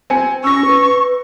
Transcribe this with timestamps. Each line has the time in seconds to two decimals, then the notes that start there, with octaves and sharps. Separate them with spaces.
0.10 C4 G#5 C#7
0.44 C#4 C#6 E6 A#6
0.66 B4